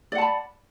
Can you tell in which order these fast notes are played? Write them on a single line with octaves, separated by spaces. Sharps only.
D5 F#5 A5 B5